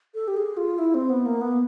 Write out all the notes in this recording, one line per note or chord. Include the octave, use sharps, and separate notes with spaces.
A4
G4
G#4
F4
E4
C4
B3
A#3
B3